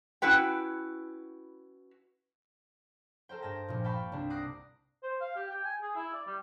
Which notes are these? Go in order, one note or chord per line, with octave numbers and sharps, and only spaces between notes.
C#4 E4 F#4 B4 G5
A4 A#4 C5 G5
G2 G#4 G5 A5 A#6
A#1 A#2
F5 G5 A5 B5 C#6
C2 D4
F#5 D6 D#6 F#6 A#6 C7
C5
F5
G4
G5
G#5
G#4
E4
D5
G3